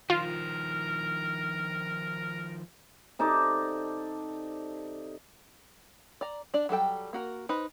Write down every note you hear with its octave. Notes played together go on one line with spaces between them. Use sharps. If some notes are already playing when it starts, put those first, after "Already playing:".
D#3 F3 F4 A#4
C3 D#4 A4 D5
D5 A#5
D4 D5
F#3 G3 A4 G5
A#3 F#4 A#4
D#4 B4 C5